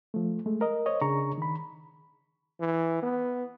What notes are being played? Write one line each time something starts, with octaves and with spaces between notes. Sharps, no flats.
F3 A3
G#3 A3
A#4 D#5
C5 C#5 D#5
C#3 D4 G#4 A#5 C#6
D#3 B5
E3
B3